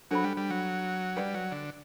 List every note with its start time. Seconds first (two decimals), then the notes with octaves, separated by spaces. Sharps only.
0.11 F#3 D4 A4 C5 G5 B5
0.24 G3
0.37 G3
0.50 F#3
1.16 G3 B4 D5 F#5
1.34 F#3
1.52 D3